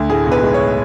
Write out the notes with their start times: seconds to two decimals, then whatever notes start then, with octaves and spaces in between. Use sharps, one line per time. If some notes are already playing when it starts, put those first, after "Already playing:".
Already playing: D2
0.09 A2 G#4
0.26 B1
0.32 B4
0.43 G#3
0.54 C#5